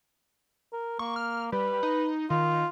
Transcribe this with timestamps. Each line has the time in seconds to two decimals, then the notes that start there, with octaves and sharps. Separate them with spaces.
0.73 A#4
0.99 A#3 C#6
1.16 F6
1.52 G3 B4
1.83 D#4
2.30 D#3 F4